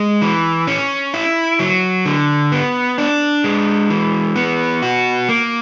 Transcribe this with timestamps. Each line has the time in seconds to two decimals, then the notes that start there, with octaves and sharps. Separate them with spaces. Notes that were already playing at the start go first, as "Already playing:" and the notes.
Already playing: G#3
0.21 E3
0.67 C#4
1.14 E4
1.59 F#3
2.05 D3
2.52 B3
2.98 D4
3.44 G#3
3.90 E3
4.36 B3
4.82 F#4
5.29 A#3